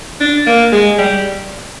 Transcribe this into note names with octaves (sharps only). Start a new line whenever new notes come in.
D4
A#3
G#3
G3